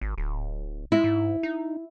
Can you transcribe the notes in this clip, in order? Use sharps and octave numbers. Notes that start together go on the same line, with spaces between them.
G#1
D1
G#3 E4
G#2
D#4